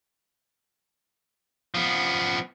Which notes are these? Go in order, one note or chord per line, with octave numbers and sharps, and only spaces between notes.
F3 B3